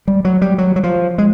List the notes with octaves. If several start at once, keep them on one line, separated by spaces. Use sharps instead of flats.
G3
F#3
G3
F#3
F#3
F3
G#3